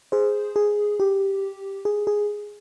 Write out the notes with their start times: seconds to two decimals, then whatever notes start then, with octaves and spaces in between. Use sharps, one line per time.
0.12 G#4 C5
0.56 G#4
1.00 G4
1.85 G#4
2.07 G#4